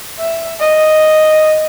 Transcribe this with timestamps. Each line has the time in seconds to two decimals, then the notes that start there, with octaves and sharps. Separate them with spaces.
0.19 E5
0.60 D#5